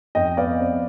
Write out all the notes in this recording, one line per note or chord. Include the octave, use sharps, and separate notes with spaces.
F2 D#5 G5
B3 D5 F5
C4